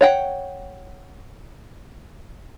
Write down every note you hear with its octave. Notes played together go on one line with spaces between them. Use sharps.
C#5 F#5 G5